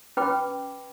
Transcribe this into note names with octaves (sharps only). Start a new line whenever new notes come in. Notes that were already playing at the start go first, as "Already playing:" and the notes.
C#4 B4 G5 B5 D6